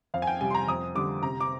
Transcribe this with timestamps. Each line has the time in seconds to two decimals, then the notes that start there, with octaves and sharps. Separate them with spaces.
0.14 F2 F5
0.22 G#5
0.27 G5
0.41 C3 G3 G#5
0.50 C6
0.55 A#5
0.68 F2 D#6
0.95 D3 G3 D6
1.22 C3 A#5
1.41 D6